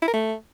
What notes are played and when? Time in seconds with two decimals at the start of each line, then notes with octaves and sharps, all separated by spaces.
0.02 E4
0.08 A#4
0.13 A3